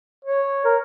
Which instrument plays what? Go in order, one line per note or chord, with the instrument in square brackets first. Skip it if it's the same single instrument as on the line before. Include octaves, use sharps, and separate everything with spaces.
[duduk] C#5
A#4